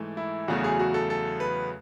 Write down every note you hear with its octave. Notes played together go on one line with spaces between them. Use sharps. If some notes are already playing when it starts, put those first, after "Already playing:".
Already playing: G#2 E3 A3
E4
E2 C#3 F#3 A3 F#4
G#4
F#4
A4
A4
B4